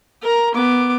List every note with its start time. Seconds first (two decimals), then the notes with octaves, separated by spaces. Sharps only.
0.22 A#4 A#5
0.54 B3 D6